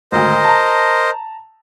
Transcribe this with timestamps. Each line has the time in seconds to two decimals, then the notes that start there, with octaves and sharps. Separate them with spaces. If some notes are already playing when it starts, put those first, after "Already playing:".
0.12 G#1 D2 A#4 C5 D#5
0.44 A5 A#5